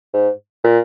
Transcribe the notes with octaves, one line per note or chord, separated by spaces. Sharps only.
G#2
A#2